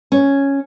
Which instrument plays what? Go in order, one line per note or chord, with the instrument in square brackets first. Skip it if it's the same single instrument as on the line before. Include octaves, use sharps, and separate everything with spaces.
[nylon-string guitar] C#4